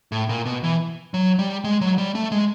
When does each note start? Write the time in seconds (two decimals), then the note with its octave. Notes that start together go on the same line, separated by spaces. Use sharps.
0.12 A2
0.29 A#2
0.45 B2
0.63 E3
1.14 F#3
1.39 G3
1.64 G#3
1.81 F#3
1.98 G3
2.15 A3
2.32 G#3